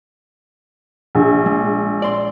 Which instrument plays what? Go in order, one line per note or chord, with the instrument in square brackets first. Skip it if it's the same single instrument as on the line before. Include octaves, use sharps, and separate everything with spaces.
[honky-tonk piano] A#1
[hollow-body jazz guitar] G#3
D5 C6